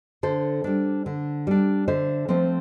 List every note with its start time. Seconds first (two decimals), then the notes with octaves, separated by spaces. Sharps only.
0.23 D3 A4 C5
0.64 G3 D4
1.06 D3
1.47 G3 D4
1.88 D3 C5 E5
2.29 F3 A3 C4